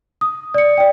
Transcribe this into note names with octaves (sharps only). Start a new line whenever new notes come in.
D#6
D5 C#7
D5 G5